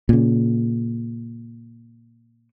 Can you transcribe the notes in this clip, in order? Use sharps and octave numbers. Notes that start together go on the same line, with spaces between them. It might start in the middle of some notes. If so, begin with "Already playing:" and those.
A#2 C#3